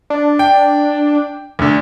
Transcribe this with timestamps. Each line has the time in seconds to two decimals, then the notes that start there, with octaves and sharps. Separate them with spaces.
0.10 D4
0.39 G5
1.59 D2 D3